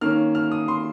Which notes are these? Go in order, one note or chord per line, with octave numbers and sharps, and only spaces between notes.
D#3 A#3 C#4 F6
F6
D#6
C6